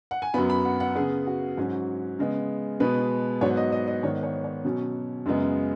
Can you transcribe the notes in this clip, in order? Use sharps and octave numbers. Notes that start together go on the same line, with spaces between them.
F#5
G#5
F#2 F#3 B3 B5
B5
F#5
F#5
C#3 B3 G#4
F#4
G#2 F#3 C#4
C#3 G#3 B3
B2 G#3 B3 B4
G#2 F#3 B3 C#5
D#5
D#5
D#5
G#2 D#3 B3 C#5
C#5
C#5
B2 F#3 C#4
F#2 C#3 G#3 B3